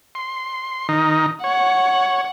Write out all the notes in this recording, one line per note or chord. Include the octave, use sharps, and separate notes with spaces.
C6
D#3 D#4
C#5 F#5